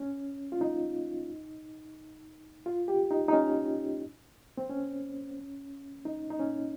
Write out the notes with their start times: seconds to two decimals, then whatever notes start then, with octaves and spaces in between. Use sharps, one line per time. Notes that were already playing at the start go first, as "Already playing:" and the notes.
Already playing: C#4
0.52 F4
0.61 D#4
2.66 F4
2.88 G4
3.11 D#4
3.28 D#4
3.33 C#4
4.57 C4
4.69 C#4
6.05 D#4
6.30 D#4
6.40 C#4